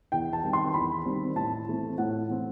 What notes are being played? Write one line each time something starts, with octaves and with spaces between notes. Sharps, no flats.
E2 G5
A5
D#3 G3 C4
C6
E2 B5
D#3 G3 C4
A2 A5
E3 A3 C4
A2 F#5
E3 A3 C4